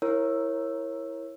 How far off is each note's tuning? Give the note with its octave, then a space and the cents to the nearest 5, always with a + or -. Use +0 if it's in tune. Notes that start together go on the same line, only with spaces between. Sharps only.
E4 +0 A#4 +0 C#5 -25